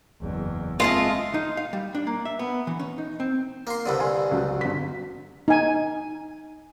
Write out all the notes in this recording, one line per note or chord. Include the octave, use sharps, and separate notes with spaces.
F#1 E2
G#3 A3 C4 F4 D#5
D#4
F5
G3
D4
A#3
E5
B3
E3
C#4
D#4
C4
A#3 C6
C2 G2 D3
F5 G#5 C6
C#2 F#3
G1 B6
D#4 G#5